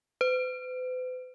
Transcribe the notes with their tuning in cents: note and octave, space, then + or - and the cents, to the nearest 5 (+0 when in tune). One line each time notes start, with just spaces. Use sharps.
B4 +45